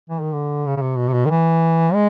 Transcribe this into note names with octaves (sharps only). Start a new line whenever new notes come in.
E3
D#3
D3
C#3
C#3
C3
B2
C3
B2
D#3
E3
G#3